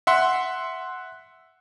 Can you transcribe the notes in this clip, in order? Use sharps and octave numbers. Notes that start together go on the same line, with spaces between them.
E5 F#5 C6